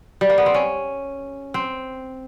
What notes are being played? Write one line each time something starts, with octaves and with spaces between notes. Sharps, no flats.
G3
A#3
B3
C4
C#4
C4